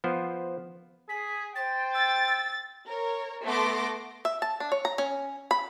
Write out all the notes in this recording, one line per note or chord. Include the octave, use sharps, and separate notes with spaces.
F3 B3 C5
G#4 B6
C5 G5 A6
E6 A6
E6
A#4 C#5
A3 B3 A4 C6 D6 A#6
E5
A5
D4
C#5
A#5
C#4
B5